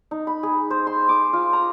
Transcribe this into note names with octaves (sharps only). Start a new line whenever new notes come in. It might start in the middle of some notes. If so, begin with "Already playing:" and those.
D#4
B5
G#4
C5
C6
D6
F4
A#5